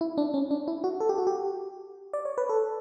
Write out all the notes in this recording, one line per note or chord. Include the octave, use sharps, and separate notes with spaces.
E4
D4
C#4
D4
E4
F#4
A4
G4
F#4
G4
D5
C#5
B4
A4